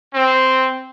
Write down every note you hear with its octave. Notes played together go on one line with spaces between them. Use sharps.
C4